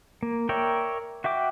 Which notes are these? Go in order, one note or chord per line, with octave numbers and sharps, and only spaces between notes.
A#3
A#4 C#5 D5 E5 G5
F#4 E5 G5 D6